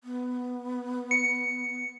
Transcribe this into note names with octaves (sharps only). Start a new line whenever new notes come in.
B3
C#7